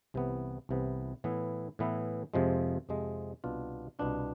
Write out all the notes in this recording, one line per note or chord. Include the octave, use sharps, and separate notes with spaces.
C2 C3 E3 B3
C2 C3 E3 B3
A2 E3 B3 E4
A2 E3 B3 E4
F2 C3 F3 G#3
F2 C3 F3 G#3
C2 B2 B3 D4 F4
C2 B2 B3 D4 F4